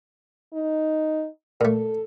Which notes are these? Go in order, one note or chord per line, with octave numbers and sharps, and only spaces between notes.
D#4
A#2 A3 A4